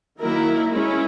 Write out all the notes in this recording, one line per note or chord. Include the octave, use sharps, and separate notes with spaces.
D#3 F#3 A#3 E4 A#4
G#3 C#4 E4